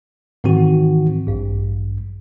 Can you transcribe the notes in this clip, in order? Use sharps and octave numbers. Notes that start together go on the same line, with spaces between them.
G#2 D#3 E3 C4 F#4
A1 G2